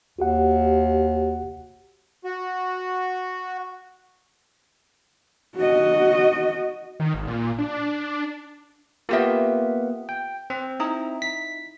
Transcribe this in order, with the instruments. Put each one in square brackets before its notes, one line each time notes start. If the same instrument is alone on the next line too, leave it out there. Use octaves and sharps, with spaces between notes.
[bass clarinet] D#2 [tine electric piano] F#4 G4 F#5
[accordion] F#4
[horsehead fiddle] F#4 D#5
[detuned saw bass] D#3
G#1
A#2
D4
[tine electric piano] A#3 B3 [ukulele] F4 G4 E5
[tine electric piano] G5
C4
[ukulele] D#4 E4 A#5
[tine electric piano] B6